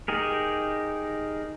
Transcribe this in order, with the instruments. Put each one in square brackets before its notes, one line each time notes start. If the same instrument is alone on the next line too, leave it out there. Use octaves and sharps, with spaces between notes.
[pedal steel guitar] D#4 G4 G#4 A#4